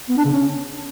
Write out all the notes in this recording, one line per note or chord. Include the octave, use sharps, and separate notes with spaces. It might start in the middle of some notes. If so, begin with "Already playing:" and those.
B3
D4
C#3
C#4